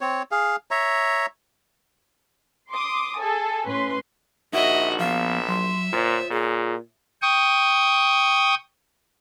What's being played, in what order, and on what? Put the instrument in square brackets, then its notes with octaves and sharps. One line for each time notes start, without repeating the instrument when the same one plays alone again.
[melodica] C4 C#5
G#4 F5
C#5 E5 A#5
[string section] C6 D6 D#6
G#4 A4 G#5
A2 C#4 B4 C6
[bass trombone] A#1 [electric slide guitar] D#4 A#4 [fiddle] F#4 D#5 [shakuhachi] E5
[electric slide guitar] F3 B3 [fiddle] E5 [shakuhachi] F5
[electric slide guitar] F#3 [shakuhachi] C6
[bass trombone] A#2 [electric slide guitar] F4 C#5 [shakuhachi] C5
[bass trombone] A#2 [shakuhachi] G#4
[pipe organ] G5 C#6 D#6